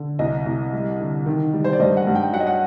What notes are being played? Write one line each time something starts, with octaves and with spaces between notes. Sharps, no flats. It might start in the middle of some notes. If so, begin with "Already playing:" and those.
Already playing: D3
C2 D#5
C2
G3
D3
D#3
G3
C5
D5
G2 D#5
F#5
G2
G5
F#3 F#5
D#5
F#5